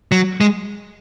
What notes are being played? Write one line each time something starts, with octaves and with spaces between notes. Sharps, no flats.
F#3
G#3